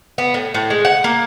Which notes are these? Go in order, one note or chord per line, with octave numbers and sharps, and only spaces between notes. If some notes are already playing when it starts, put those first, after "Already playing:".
B3
A2
A2
G#3
F#5
A#3